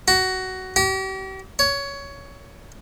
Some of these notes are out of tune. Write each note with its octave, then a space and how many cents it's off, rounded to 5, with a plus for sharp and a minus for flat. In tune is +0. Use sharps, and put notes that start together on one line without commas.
F#4 +15
G4 -40
C#5 +15